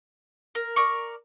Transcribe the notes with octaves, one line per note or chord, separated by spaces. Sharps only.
A#4
A#4 D5 C#6